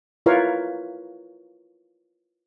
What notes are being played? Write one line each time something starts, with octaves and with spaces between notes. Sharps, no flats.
E4 F4 A#4 B4 C#5 F5